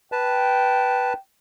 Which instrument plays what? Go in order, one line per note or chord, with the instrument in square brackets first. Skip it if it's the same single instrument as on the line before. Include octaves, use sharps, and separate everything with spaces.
[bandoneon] B4 A5 [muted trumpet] G5